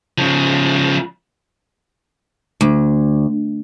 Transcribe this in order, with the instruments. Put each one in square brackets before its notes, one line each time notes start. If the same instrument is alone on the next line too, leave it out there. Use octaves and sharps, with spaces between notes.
[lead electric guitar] C#3 F3
[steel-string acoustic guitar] D2